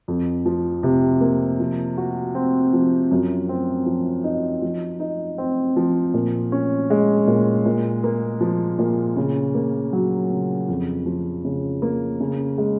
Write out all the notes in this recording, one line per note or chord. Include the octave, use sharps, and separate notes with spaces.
F2
F3
C3
A#3
F3
F#4
C4
F3
F#2
C4
F3
D#4
F3
D#4
C4
F3
A#2
C#4
G#3
A#2
A#2
A#3
F3
A#2
C#3
A#3
F#3
C#3
F2
F3
C#3
A#3
C#3
G#3